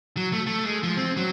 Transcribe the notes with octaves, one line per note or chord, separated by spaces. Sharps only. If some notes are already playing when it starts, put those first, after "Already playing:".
F#3
A3
A3
G#3
F3
C4
F#3